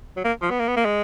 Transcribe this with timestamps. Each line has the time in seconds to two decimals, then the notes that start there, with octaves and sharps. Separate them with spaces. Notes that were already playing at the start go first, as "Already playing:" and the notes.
0.17 F#3
0.25 A#3
0.42 F3
0.50 B3
0.60 A#3
0.68 B3
0.77 A#3
0.85 G#3